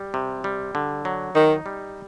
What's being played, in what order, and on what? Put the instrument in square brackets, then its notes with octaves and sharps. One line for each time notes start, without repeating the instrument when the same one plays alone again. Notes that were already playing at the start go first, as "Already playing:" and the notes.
Already playing: [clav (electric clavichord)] G3
C3
G3
D3
F#3
[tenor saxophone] D#3 [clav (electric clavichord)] D#4
[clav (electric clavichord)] G3